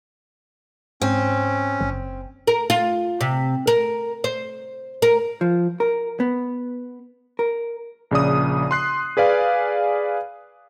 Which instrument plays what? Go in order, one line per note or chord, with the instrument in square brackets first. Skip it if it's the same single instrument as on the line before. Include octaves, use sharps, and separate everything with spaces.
[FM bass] G#2 [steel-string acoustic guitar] C4 [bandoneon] C#4
[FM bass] F#1
[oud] A#4
F4
C3
A#4
C5
A#4
[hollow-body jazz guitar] F3
A#4
B3
A#4
[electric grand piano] A#1 C#3 D5 D#6
C6 F#6 C7
G#4 B4 D5 F5 G#5